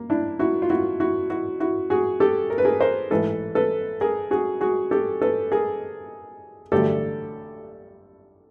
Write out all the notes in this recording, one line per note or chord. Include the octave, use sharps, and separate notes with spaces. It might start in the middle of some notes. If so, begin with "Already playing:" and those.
Already playing: A#3
D4 E4
E4 F#4
F4
E4 F#4
E4 F#4
E4 F#4
E4 F#4
F#4 G#4
G4 A4
A#4
B4
G#4 A#4
A#4 C5
A1 G#2 E3 A4 B4
A4 B4
G#4 A#4
F#4 G#4
F#4 G#4
G4 A4
A4 B4
G#4 A#4
A1 G2 D3 F#3 A3 G4 A4